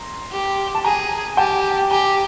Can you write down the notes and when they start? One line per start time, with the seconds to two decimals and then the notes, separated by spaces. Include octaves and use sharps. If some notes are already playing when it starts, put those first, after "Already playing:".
Already playing: A#5 C6
0.32 G4
0.75 A5
0.84 G#4 G#5 A#5
1.37 G4 G5 A5
1.90 G4 G#5 A#5